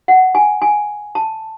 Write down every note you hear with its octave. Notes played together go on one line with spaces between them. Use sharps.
F#5
G#5
G#5
A5